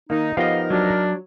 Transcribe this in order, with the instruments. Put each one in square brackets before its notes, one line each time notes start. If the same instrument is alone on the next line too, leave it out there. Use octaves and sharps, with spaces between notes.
[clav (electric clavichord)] D#3 A#3 [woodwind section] D#4
[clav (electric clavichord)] F3 B3 G4 [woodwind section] D#4 A#4 [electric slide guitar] D#5 F5
[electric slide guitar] F#3 [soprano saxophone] D4